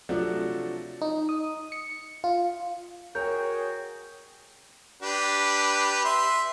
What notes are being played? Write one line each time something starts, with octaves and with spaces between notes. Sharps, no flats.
C3 F3 F#3 A3 D4 F#4
D#4
D#6
C#7
F4
F#4 G#4 A#4 C#5 G5 G6
D4 G4 B4
E5 C6